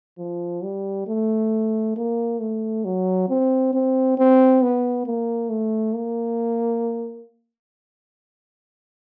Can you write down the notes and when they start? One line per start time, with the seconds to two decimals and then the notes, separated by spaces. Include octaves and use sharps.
0.19 F3
0.64 G3
1.07 A3
1.97 A#3
2.40 A3
2.85 F#3
3.29 C4
3.74 C4
4.18 C4
4.62 B3
5.07 A#3
5.50 A3
5.95 A#3